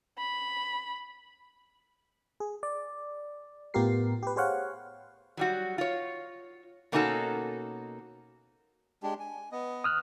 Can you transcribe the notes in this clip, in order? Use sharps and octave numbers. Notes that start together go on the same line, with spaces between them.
B5
G#4
D5
A2 B3 F4 G4 A#4 C7
G4 B4
G4 G#4 C5 C#5 F5 F#5
F#3 G3 F#4
F4 C#5
B2 A#3 C#4 D#4 F#4 A4
G#3 D4 G4
G#5
B3 D#5
D#6 F6 F#6